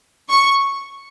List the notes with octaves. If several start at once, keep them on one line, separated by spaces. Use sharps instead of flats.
C#6